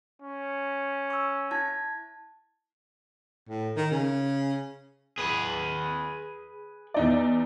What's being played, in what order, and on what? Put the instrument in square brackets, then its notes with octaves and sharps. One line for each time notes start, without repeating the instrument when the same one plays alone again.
[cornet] C#4
[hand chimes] C#6 E6
E4 A5 G#6
[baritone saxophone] A2
D#3
C#3
[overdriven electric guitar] G#4 B4
[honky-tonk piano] E2 D#4 D5